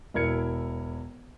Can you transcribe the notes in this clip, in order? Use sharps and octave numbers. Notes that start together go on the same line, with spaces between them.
E1 E4 A#4 G#6 C#7